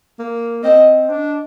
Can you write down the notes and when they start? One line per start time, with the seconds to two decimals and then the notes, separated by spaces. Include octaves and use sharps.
0.19 A#3
0.63 C4 D#5
1.09 D4